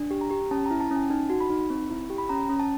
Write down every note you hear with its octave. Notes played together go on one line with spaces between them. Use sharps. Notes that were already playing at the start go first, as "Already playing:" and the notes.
Already playing: D4
G4
A#5
G4
C#4 A5
E4 A#5
A5
C#4 G#5
D#4 A5
F#4
B5
D#4
C4
E4
G4
B5
C#4 A#5
C#4
A5